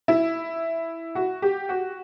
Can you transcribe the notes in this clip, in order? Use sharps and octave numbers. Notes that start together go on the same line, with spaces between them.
E4
F#4
G4
F#4